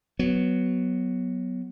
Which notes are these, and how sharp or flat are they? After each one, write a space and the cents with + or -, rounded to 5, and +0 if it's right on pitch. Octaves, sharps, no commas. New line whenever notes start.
F#3 +0 B3 +0